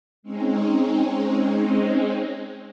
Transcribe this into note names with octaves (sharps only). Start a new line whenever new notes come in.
G#3 C4 C#4 D#4